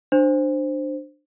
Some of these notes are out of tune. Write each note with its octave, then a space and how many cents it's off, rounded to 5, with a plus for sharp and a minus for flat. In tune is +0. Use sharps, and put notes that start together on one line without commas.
D4 +20 C5 +0